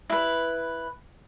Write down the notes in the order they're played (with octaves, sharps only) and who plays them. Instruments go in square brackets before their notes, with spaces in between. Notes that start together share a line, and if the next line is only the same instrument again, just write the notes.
[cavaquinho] E4 B4